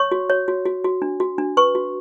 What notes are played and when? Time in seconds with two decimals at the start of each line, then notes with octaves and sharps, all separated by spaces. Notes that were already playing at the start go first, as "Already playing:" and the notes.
Already playing: C#5 C#6
0.12 F#4
0.30 C#5
0.48 F#4
0.66 F#4
0.84 F#4
1.02 D4
1.20 F#4
1.38 D4
1.57 B4 C#6
1.75 F#4